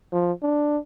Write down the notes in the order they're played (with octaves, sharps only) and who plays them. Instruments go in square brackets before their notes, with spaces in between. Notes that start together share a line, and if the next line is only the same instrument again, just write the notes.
[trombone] F3
D4